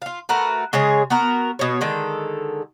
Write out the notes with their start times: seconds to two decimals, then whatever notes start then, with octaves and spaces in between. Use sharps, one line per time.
0.02 F4 F5
0.29 A3 F#4 A#4 B4
0.73 C#3 G#3 G#4 C#5
1.10 B3 F#4 A#4
1.59 B2 C#5
1.81 D3 D#3 G#3 A4